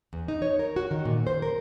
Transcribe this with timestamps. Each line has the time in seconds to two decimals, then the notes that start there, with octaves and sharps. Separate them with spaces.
0.13 E2
0.28 D#4
0.42 C#5
0.59 A#4
0.76 F#4
0.91 D#3
1.05 A#2
1.27 C5
1.42 A#4